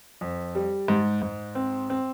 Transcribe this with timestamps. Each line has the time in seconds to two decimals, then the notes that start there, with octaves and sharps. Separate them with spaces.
0.21 F2
0.55 G3
0.88 G#2
1.22 G#2
1.55 C4
1.90 C4